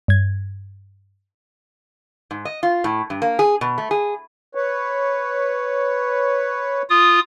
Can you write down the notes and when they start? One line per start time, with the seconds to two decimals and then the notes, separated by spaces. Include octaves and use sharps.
0.08 G2 G#6
2.31 G#2
2.45 D#5
2.63 F4
2.84 A2
3.10 G2
3.22 A#3
3.39 G#4
3.61 B2
3.78 A3
3.91 G#4
4.55 B4 C#5
6.90 F4 D#6